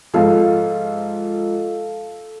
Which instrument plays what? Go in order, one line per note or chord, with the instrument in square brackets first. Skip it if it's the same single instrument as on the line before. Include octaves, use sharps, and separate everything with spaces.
[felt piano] G#2 F3 [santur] A4 F5